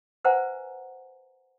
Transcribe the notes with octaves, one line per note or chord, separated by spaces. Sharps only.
B4 C5 E5 F#5 G#5 A#5